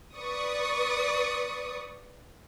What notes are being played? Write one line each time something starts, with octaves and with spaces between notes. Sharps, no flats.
B4 D5 C#6 D#6